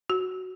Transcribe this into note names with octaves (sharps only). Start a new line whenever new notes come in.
F#4